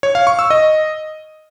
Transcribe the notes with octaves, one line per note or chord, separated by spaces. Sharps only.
C#5
F5
C#6
E6
D#5